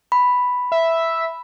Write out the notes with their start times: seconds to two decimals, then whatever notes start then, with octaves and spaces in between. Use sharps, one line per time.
0.12 B5
0.72 E5